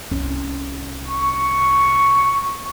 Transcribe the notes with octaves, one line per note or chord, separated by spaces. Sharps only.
C2 C#4
C#6